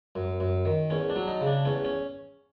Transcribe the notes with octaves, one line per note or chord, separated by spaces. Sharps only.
F#2
F#2
D#3
E2 C#4
D4
F#3
D#4
C#3
D4
E2 C#4
C#4